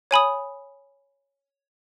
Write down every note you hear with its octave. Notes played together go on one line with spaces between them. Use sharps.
C#5 G#5 B5 D#6